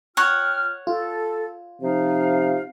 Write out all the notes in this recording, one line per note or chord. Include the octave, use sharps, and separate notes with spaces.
F4 C#5 F#5 G5 F6
F4 A4
C3 F3 D#4 F5